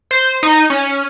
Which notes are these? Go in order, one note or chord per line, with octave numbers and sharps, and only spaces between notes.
C5
D#4
C#4